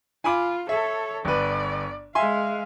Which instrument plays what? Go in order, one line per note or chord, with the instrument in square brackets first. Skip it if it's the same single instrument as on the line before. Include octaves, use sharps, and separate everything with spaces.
[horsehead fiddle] F4 [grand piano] G#5 B5 D6
[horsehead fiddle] A4 C#5 [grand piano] E5
[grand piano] G1 B4 [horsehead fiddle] D5
[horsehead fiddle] G#3 F5 [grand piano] E5 G#5 C6